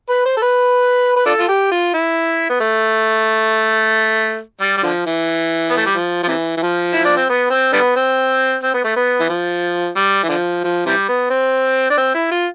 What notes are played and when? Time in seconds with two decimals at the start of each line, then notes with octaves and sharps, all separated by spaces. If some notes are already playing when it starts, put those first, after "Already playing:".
0.09 B4
0.25 C5
0.37 A4
0.42 B4
1.16 B4
1.26 D4 F4 A4
1.38 F4
1.48 G4
1.71 F4
1.94 E4
2.50 B3
2.60 A3
4.60 G3
4.77 G3
4.83 D3 F3
5.06 E3
5.70 B3
5.77 A3
5.86 G3
5.95 F3
6.23 F3
6.28 C3 E3
6.57 E3
6.62 F3
6.93 E4
7.05 D4
7.17 C4
7.29 B3
7.50 C4
7.73 D3 G3 B3
7.96 C4
8.63 C4
8.74 B3
8.84 A3
8.96 B3
9.20 E3
9.30 F3
9.96 G3
10.24 E3
10.29 D3 F3
10.64 F3
10.86 C3 E3 G3
11.08 B3
11.30 C4
11.90 D4
11.98 C4
12.14 E4
12.31 F4